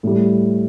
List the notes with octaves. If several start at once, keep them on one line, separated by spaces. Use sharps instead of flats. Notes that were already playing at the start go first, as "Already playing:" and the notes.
A2 G3